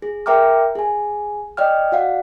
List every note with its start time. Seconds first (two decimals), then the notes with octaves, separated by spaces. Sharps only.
0.02 G#4
0.26 A#4 E5 G5 A#5 D6 F6
0.75 G#4 G#5
1.57 D5 D#5 G5 F6
1.92 F#4 D5 F5 F#5